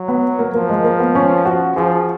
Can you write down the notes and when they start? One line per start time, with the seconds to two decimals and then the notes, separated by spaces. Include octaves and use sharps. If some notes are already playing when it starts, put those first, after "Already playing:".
Already playing: F#3
0.08 B3
0.39 A#3
0.54 F3 A#3
0.69 G#3
0.85 A#3
1.00 B3
1.15 C#4
1.46 F#4
1.76 F3 G#4